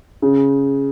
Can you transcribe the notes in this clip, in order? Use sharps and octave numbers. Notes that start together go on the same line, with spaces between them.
C#3